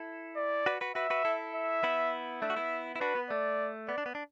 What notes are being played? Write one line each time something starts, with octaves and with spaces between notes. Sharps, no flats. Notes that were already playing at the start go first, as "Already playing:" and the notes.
Already playing: E4 A4
D5
F#4 B4
F#4 B4
F#4 B4 E5
F#4 B4
E4 A4
E5
B3 E4
A3 D4 E5
F#4
B3 E4
E4
D4 F#4 B4
B3
A3 D5
B3 D5
D4
B3
D4